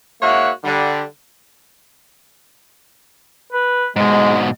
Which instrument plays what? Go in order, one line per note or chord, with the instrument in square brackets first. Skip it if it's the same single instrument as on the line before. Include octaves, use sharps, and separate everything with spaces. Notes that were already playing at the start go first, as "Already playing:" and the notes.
[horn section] G#2 A#3 F#4 C#5 E5 F#5
D3 G3
[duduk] B4
[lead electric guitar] G#2 B2 [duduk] G#3